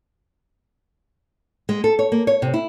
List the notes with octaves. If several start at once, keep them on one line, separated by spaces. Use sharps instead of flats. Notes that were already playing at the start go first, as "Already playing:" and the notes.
G#3
A4
C#5
A#3
C#5
C3
E4